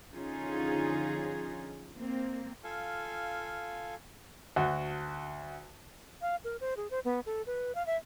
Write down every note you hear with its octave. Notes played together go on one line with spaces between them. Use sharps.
D3 F3 C#4 D#4 F4 G#4
A#3 C4
F4 A4 F5 G#5
D2 F#4
F5
A#4
C5
G#4
C5
B3
A4
B4
F5
E5